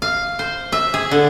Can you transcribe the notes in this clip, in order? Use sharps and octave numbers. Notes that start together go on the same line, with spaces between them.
F5
C5
E5
G#4
D3